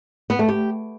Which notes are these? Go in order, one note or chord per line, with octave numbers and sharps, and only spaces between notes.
B3
A3
G4